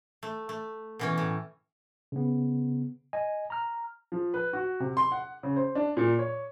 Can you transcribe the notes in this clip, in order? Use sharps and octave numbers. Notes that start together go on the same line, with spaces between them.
A3
A3
B2 E3 C#4
A2
C#3 B3
D#5 G#5
A#5 F6
F3
B4
F#4
C3
C6
F#5
C#3
C5
D4
A#2
C#5